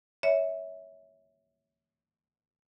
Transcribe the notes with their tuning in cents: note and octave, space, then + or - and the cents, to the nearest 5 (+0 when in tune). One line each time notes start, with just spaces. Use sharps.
C#5 +10 E5 -15